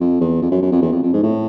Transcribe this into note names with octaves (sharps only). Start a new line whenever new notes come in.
F2
E2
F2
F#2
F#2
F2
E2
F2
F2
G#2
A2